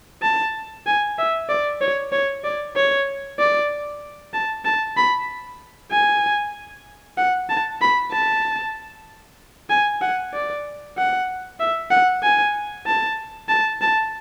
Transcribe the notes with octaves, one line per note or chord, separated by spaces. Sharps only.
A5
G#5
E5
D5
C#5
C#5
D5
C#5
D5
A5
A5
B5
G#5
F#5
A5
B5
A5
G#5
F#5
D5
F#5
E5
F#5
G#5
A5
A5
A5